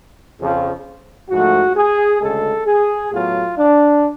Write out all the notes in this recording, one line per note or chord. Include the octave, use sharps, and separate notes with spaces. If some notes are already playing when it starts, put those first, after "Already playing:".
F2 C#3 F3
G#2 F3 A3 F#4
G#4
D2 C#3 G#3 A4
G#4
A2 F#3 B3 F4
D4